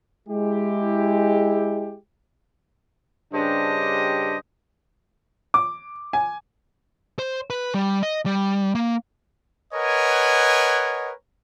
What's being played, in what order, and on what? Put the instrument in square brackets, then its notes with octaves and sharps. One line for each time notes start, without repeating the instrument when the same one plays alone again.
[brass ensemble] G#3 E4 G4
[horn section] G2 C#3 D4 G4 C5 D#5
[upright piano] D6
G#5
[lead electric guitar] C5
B4
G3
D#5
G3
A#3
[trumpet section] A#4 B4 C#5 D#5 F#5 G#5